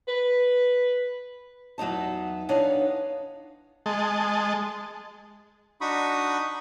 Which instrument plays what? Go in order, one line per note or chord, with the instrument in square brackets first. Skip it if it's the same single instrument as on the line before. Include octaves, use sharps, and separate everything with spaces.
[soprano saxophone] B4
[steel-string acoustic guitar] E2 F#3 B3 D#4 A5
E2 B3 D4 D#4 C#5 F5
[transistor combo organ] G#3 D#5 A5
[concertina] D4 D#4 F#4 B5 C#6 D#6